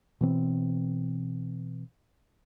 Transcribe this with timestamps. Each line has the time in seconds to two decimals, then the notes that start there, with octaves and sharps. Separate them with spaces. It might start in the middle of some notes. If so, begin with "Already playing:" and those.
0.21 B2 E3 C4